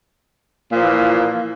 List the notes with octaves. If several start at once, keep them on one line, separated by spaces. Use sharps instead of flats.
A#2 E3 F3 A#3